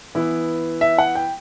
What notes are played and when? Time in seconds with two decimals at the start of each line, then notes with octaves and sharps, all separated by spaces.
0.15 E3 B3 E4
0.81 E5
0.98 F#5
1.15 G5